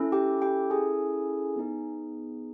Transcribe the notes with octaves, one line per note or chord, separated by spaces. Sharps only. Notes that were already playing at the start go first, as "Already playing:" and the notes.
Already playing: C#4 E4 A4
G4 G5
G4 G5
G#4 G#5
B3 D#4 G#4